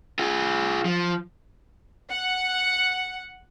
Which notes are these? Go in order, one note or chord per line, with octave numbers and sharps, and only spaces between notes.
F4 G#4
F3
F#5